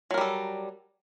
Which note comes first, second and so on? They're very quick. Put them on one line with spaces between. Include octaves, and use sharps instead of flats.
F#3 A#4 G3 A4